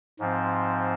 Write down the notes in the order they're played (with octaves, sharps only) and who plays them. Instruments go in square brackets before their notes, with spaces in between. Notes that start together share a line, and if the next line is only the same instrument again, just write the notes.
[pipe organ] G#2 F3 C4